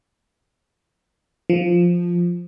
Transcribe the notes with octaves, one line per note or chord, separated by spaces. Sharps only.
F3